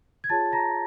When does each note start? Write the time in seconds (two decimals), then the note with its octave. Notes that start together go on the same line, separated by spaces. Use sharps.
0.24 G#6
0.29 F4 G#4 C#5 A5 A6
0.53 A#5 A#6